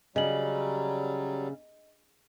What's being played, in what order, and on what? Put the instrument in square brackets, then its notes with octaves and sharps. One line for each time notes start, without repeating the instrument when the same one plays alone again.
[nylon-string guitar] C#3 [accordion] F#3 G3 [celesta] D#5 F#7